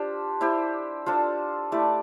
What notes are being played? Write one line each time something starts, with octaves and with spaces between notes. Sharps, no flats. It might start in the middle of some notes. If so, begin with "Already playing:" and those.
Already playing: D4 F4 G4 C5
E4 G4 C5
D4 F4 A4 C5
A3 E4 G4 D5